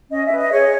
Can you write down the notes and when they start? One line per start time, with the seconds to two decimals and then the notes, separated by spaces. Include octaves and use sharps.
0.10 C#4 D#5
0.24 E5
0.30 B4
0.37 D#5
0.51 G#4 C#5